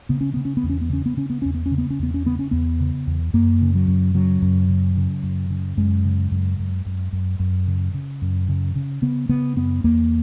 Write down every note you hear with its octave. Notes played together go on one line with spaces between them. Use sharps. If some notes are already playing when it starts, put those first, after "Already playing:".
C#3 B3
C#4
C#3 B3
C#4
B3
E2
C#4
B3
C#3 C#4
B3
C#3 C#4
B3
E2 C#4
B3
C#4
C#3
B3
C#4
E2 B3
C#4
C#3 B3
C#4
E2 B3
C#3
E2
F#2 A#3
C#3
F#3
F#2
C#3 F#3
F#2
C#3
C#3
F#2
C#3
F#2 G#3
C#3
F#2
F#2
F#2
F#2
F#2
C#3
C#3
F#2
C#3
C#3
C#3 B3
C#3 B3
F#2 B3
E2 A#3